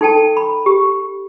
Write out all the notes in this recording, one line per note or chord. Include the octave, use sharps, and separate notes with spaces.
D#4 A4 G5 A5
B5
G4